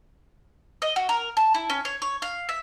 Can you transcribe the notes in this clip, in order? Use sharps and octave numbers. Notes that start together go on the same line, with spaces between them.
D#5
F#4
A#4
A5
E4
C#4
C#5
C#5
F5
E5